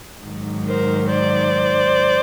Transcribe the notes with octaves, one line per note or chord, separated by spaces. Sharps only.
G#2 D#3 F#3
A#4 C5
C5 D5